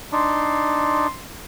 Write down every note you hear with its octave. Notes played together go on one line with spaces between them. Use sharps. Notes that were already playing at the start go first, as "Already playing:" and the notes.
D4 D#4 C6